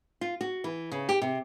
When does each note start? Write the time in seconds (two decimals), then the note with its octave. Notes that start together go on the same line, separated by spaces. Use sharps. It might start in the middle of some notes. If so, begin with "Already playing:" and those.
0.21 F4
0.41 F#4
0.64 E3
0.92 C#3
1.09 G4
1.21 C3